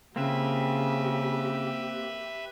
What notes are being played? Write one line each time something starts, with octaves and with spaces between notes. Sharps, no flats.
C#3 A#3 C4 F4 G4 B4 E5